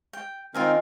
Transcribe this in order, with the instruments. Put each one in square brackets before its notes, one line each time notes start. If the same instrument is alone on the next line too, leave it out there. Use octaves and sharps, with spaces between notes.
[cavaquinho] G5
[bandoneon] D#3 C4 A#4 [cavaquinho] F4 D#5 G#5